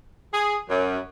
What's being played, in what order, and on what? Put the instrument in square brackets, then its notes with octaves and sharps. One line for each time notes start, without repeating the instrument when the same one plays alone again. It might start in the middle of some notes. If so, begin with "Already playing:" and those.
[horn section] G#4
F#2